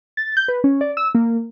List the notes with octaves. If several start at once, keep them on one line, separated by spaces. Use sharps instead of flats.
A6
G6
B4
C#4
D5
E6
A#3